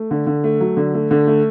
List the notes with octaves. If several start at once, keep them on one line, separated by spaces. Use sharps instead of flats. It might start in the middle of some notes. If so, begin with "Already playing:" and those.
Already playing: A3
D3
D3
A3
F#3
D3
A3
D3
A3